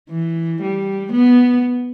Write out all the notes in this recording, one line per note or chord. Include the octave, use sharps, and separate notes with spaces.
E3
G3
B3